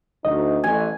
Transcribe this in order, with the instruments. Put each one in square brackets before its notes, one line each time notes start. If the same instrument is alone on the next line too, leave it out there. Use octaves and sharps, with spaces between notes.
[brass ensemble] D2 D#4 [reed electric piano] D#5
[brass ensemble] A1 [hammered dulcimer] G#5